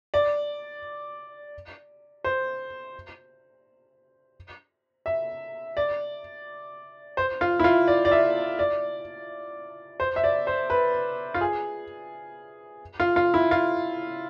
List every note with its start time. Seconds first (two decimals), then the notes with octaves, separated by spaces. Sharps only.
0.14 D5
2.24 C5
5.06 E5
5.77 D5
7.17 C5
7.41 F4
7.60 E4
7.64 F4
7.88 D5
8.05 D5
8.11 E5
8.59 D5
10.00 C5
10.16 E5
10.24 D5
10.47 C5
10.70 B4
11.34 F4
11.41 G#4
13.00 F4
13.16 F4
13.34 E4
13.51 F4